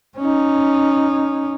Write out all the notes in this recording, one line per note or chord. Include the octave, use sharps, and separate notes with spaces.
C#4 D#4